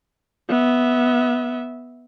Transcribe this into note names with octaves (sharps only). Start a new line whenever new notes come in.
B3 E5